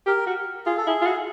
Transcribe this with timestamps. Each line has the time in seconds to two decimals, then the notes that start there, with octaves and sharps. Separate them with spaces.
0.06 G4 A#4
0.26 F#4
0.66 F4 G#4
0.77 A4
0.87 E4 G#4
1.01 F4
1.06 F#4